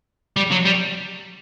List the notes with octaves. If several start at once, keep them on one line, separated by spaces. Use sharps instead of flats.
G3
F#3
G3